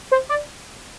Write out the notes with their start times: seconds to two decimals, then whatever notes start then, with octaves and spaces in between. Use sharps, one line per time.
0.12 C5
0.29 D5